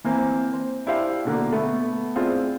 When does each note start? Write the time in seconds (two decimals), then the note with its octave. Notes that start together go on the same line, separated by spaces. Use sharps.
0.04 E3 A#3 C4
0.53 C5
0.86 D4 E4 G4 C5 F5
1.25 B2 D3 A#3
1.52 A3 B3
2.16 C4 D4 E4 F4 G#4